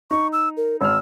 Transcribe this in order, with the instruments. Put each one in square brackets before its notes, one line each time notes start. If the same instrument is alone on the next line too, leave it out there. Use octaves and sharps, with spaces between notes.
[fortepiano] D#4 [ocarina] C#6
[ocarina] E6
A#4
[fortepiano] G#1 F6 [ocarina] E6